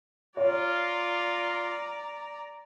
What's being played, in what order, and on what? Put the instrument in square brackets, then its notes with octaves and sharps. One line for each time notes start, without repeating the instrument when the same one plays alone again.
[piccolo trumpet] F4 [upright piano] C#5 [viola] D5 A#5